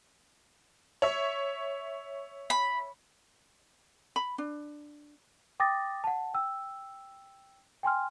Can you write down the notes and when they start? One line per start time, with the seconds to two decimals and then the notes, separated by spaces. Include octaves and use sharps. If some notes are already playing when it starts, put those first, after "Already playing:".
1.02 C#5 E5
2.50 B5
4.16 B5
4.38 D4
5.60 G5 D6 D#6 A6 A#6
6.04 F#5 A5
6.34 G5 E6
7.83 G5 G#5 C6 F6